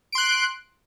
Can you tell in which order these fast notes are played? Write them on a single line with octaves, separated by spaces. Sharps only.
D7 C6 F#6